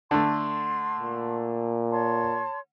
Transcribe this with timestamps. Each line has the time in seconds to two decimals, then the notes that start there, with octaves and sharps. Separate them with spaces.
0.11 D3 A3 C6
0.99 A#2
1.91 C#5 A5 C6